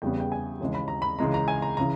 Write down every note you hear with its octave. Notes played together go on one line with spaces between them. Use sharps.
E2 C#3 G3 B3 G5
G5
G#5
D#2 C#3 E3 G#3
B5
A#5
B5
C#2 C#3 E3 G#3 A#5
A#5
G#5
A#5
C#3 E3 A#5